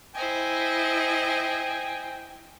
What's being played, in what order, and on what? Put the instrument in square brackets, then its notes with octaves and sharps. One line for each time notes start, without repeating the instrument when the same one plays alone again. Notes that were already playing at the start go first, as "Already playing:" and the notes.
[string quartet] E4 C5 D#5 [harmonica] G5 G#5